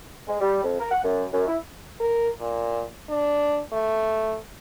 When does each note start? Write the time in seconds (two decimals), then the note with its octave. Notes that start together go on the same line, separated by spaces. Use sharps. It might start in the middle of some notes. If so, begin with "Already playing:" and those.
0.28 G#3
0.41 G3
0.64 F2
0.80 A#4
0.91 F#5
1.04 F#2
1.33 F#2
1.47 E4
2.00 A#4
2.40 A#2
3.09 D4
3.72 A3